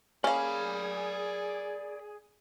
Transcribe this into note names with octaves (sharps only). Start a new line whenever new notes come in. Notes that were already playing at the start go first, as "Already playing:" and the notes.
A#3 C#4 G#4 D5 F5 B5